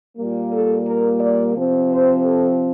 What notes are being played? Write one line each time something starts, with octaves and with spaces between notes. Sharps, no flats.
A#2 G3 A#3
A4
A#4
D5
C3 F3 C4
C5
A4